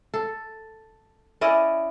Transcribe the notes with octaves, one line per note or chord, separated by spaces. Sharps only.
A4
C#4 E4 D5 D#5